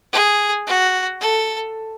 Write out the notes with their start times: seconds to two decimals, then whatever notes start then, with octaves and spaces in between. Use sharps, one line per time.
0.13 G#4
0.67 F#4
1.21 A4